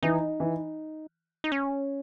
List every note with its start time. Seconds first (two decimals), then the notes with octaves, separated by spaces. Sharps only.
0.02 E3 D#4
0.40 E3
1.44 D#4
1.52 C#4